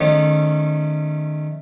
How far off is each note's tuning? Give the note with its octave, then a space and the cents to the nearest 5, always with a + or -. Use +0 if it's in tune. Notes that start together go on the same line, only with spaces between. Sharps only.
D#3 -35 A3 -30 C#4 -25